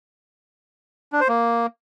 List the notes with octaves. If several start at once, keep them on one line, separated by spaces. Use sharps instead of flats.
D4
C5
A#3